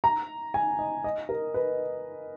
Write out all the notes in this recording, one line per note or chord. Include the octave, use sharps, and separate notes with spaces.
A#5
G#5
D#5
D#5
A#4
B4